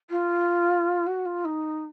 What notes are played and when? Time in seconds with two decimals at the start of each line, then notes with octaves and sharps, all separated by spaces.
0.10 F4
1.07 F#4
1.26 F4
1.45 D#4